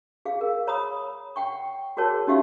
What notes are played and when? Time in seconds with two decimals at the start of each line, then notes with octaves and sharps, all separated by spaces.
0.25 G#4 F5
0.41 A#4
0.67 C#5 A#5 B5 D#6
1.36 F#5 G5 C#6
1.97 F#4 G#4 A#4 C#5 A5
2.27 C#4 D#4 F#4 G4 E5 F5